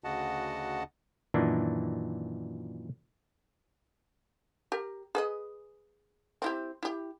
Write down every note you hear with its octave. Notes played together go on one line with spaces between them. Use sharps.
D2 C#3 F#4 D#5 F#5 A5
F#2 A#2 D#3 E3 D4
G4 A#4
G#4 B4 D#5
C4 E4 G4
E4 G4